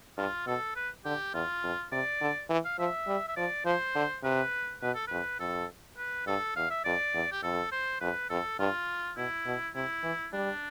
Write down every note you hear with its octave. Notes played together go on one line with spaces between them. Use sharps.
G2 F4
B2 A4
B4
D3 G4
E2 F4
F2
C3 D5
D3
E3
F5
F3 E5
G3
E5
F3 D5
F3 C5
D3
C3 B4
B2 B4
A4
F2 B4
F2 A4
B4
G2 A4
E2 F5
E5
F2 D5
E2
G4
F2 A4
C5
F2 B4
F2 A4
G2 F4
B2 E4
B2
C3 E4
E3
G3 D4